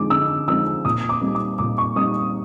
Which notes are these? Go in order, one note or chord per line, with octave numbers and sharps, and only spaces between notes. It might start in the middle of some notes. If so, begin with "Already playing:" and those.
Already playing: D3 F3 G#3 C4 D#4 D6
D3 E6
F3 G#3 C4 D#4 E6
A#2 D#6
D6
G3 C4 D#4
D6
A#2 D6
C#6
G3 C4 D#4 D#6